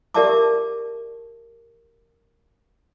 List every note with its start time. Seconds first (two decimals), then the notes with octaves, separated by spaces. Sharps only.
0.14 G4 A#4 D5 E5 A5 D6